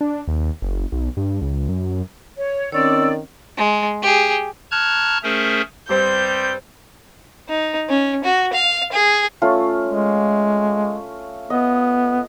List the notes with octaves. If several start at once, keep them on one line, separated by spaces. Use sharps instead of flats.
D4
D#2
F#1
B1
G2
C#2
F#2
C#5
D#3 C4 C#4 C#5 D5 E6
G#3
G4 G#4
A5 A#5 C#6 F6 F#6 G#6
A3 C#4 G#4 A#4 C5 E5
G2 G3 C4 G4 C5 G6
D#4
C#4
F#4
F5
G#4
A3 C#4 F4
G#3
B3 D#5